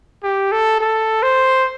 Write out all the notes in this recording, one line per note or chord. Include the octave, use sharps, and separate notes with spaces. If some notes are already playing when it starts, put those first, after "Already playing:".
G4
A4
A4
C5